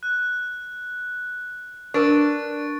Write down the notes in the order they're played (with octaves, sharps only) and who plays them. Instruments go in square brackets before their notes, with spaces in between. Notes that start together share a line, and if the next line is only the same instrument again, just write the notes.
[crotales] F#6
[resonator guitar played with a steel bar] D4 [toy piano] A#4 B4 [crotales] C#6 A6 D7